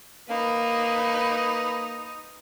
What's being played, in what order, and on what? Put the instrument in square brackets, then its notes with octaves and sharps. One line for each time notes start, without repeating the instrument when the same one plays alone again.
[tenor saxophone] A#3 [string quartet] D#4 [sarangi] B4